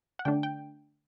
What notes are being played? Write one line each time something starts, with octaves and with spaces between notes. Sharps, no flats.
F#5
D3 A3 D4 G5
G5